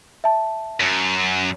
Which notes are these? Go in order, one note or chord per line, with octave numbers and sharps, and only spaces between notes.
E5 A5
F#2